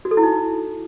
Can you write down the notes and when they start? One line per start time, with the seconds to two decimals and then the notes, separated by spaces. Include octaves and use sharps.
0.05 F#4
0.11 A4
0.17 E4
0.23 D#4